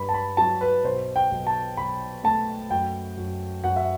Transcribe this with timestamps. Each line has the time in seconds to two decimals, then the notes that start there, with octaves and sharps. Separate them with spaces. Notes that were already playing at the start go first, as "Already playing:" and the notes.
Already playing: G2 B5
0.09 A5
0.14 B5
0.37 F#3 A5
0.61 B4
0.84 B1 C5
1.16 G5
1.31 B1
1.47 A5
1.77 B1 B5
2.24 A3 A5
2.70 F#2 G5
3.17 F#2
3.64 F#2 F#5
3.76 E5